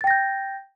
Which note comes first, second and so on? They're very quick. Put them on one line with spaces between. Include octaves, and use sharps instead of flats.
A6 G5 A#6 G6